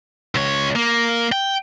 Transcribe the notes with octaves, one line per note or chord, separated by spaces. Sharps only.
C#2 C#5
A#3
G5